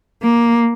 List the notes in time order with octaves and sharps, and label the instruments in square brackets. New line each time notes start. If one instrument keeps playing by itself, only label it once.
[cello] A#3